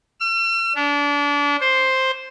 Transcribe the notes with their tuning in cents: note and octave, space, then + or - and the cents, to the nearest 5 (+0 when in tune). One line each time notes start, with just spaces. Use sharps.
E6 +45
D4 -30
C5 +5